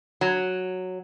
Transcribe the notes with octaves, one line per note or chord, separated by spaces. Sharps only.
F#3